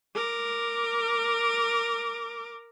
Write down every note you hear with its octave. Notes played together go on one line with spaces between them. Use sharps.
A#4 D6